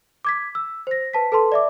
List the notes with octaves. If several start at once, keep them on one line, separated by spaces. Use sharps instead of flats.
D6 G#6 B6
E6
C5 A#6
B4 A5 B6
A4 B4 A5 C6
D5 E5 D6